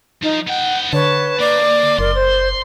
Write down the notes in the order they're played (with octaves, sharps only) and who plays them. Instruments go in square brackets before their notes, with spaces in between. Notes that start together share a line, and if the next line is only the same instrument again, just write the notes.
[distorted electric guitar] F3 [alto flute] D#4
[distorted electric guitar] B3 G5 [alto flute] F#5
[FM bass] D3 [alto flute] B4 [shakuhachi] C#5 [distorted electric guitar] A5
[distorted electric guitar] A#3 F5 [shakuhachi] D5
[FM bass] F#1 [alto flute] A#4 [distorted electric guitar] C6
[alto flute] C5